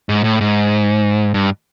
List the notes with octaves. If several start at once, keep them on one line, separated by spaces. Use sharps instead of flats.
G#2
A2
G#2
G2